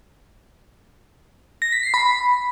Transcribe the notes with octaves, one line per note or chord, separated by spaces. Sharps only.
A#6
B6
C7
B5